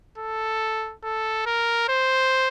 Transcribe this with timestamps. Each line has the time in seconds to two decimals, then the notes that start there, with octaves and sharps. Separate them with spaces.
0.18 A4
1.03 A4
1.46 A#4
1.89 C5